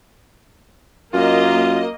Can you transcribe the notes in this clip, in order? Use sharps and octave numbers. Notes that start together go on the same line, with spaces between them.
F#2 A#3 F4 D#5